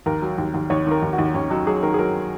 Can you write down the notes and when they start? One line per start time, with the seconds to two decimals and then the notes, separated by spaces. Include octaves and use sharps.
0.06 D#2 A#4
0.22 F#3
0.38 D#2
0.54 D#2
0.70 D#2 C#5
0.87 D#3 A#4
1.02 D#2
1.13 F#4
1.18 D#2
1.34 D#2 C#4
1.50 F#3 D#4
1.67 F#3 G#4
1.83 D#3 A#4
1.94 G#4
1.99 F#3 A#4